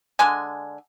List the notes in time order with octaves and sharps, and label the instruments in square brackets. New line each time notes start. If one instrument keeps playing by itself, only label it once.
[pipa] D3 G#3 G#5